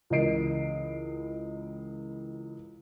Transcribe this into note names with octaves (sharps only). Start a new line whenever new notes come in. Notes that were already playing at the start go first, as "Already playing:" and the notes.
C#2 E3 A#4 D#5 C7 D7